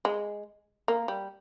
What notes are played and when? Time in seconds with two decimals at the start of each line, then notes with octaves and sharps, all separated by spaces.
0.05 G#3
0.88 A#3
1.08 G3